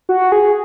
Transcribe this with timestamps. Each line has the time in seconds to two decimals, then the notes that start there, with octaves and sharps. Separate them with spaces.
0.09 F#4
0.32 G#4